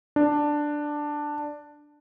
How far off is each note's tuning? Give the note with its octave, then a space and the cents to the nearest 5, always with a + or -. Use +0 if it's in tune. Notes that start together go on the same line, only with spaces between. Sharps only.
D4 +5